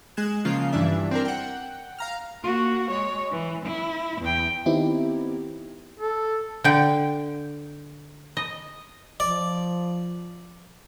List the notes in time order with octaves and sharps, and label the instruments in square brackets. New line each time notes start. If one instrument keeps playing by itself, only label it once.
[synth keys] G#3 F#6 G#6 E7
C#3 F3 A#3 F4 C7
G2 E3 D4 E5
C4 D4 A#4
F#5 G5
F5 A#5 F6
[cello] A#3 F#4
G#3 C#5
E3
E4
E2 G5
[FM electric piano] D#3 B3 C4 D#4 E4 G4
[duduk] A4
[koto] D3 G5
D#5
[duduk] F3 [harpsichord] D5